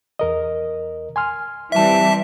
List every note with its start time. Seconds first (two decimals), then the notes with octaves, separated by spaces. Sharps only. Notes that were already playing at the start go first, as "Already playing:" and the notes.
0.19 E2 A#4 D#5
1.16 G#5 C6 F6
1.72 E3 G3 C4 E5 A5